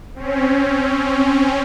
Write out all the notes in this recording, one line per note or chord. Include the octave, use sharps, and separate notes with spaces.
C4 C#4